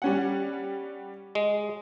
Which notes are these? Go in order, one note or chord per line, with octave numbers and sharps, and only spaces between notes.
G3 C#4 F#5
G#3